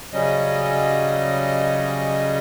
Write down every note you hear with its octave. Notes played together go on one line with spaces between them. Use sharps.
C#3 F#3 G3 C#4 D#5